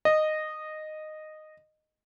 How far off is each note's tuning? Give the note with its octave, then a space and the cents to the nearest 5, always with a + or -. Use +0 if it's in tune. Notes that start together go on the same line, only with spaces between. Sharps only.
D#5 -10